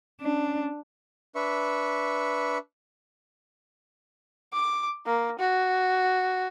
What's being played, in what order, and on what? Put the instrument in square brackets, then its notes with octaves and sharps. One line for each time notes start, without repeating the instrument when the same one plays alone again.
[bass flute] C#4 [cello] D4
[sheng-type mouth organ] D4 B4 E5 C#6
[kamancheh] D6
A#3
F#4